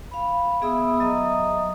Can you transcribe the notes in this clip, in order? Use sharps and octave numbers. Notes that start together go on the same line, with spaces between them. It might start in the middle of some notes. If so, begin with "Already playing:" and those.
F5 B5
B3 G#4 E5 B5 D#6 E6
F#3 D#5 E5 A#5 D#6